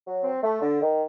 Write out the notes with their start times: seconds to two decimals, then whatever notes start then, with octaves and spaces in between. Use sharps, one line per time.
0.05 F#3
0.23 C4
0.43 A3
0.61 D3
0.81 D#3